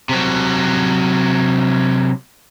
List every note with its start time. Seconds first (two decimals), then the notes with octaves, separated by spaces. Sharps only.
0.09 C3 F#3